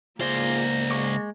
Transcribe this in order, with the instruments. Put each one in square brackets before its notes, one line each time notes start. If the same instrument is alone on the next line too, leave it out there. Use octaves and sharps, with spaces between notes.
[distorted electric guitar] C#2 C5 [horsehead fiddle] A#3 [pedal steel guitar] F4 G#4 D5 [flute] A#6
[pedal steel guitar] G#3 C#6 D6